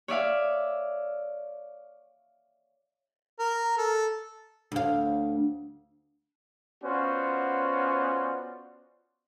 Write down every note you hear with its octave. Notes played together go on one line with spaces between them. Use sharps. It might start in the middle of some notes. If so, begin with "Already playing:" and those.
C#5 D5 E5 F5
A#4
A4
D2 F5
B3 C#4 F4 F#4 C5 D5